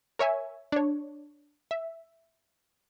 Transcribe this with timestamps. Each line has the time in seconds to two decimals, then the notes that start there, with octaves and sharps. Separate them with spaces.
0.19 A#4 C#5 E5 G#5
0.72 D4 C#5
1.71 E5